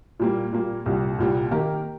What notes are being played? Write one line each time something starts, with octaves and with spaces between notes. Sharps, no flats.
A#2 G3 A#3
A#2 G3 A#3
C2 A#2 G3
C2 A#2 G3
D#3 A#3 G4 A#4